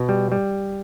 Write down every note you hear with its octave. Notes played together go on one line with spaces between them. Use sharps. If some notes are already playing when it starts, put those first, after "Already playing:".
Already playing: B2
G3
G3